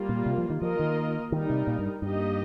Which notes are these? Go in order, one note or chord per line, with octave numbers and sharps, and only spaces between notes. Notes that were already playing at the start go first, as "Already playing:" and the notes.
Already playing: G3 A#3 F4
A#2
C3
F3
D#3
F3 A#3 F4 A#4 D#5
D#3
D#3 G3 D#4 A#4
C3
A#2
G2
G2 A#3 D#4 G4 D#5